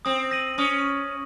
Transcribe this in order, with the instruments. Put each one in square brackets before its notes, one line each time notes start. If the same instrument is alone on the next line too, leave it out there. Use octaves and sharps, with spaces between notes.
[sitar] C4 [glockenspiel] D#6
[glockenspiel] A#6 D#7 F#7
[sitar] C#4 [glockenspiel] D#6